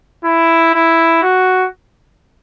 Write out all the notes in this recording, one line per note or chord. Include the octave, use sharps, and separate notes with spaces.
E4
E4
F#4